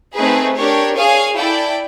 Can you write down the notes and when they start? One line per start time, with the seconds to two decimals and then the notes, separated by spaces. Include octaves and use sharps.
0.15 A3 C4 D#4 G#4 B4
0.56 D4 G4 A#4 C#5
0.96 G#4 C#5 F5 G#5
1.38 E4 A4 D5 G5